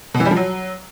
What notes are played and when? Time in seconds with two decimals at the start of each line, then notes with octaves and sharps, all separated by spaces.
0.14 B2
0.20 E3
0.25 G3
0.31 F3
0.37 F#3